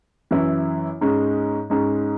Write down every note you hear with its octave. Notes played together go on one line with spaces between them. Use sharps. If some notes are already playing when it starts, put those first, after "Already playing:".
F#2 E3 C#4 E4
G#2 G#3 C#4
G#2 G#3 C#4